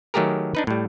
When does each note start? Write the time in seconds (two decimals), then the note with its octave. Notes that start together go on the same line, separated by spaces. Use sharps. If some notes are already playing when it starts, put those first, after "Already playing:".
0.14 D#3 F#3 A3 G4 G#4 A#4
0.55 D4 D#4 B4
0.67 A2 G3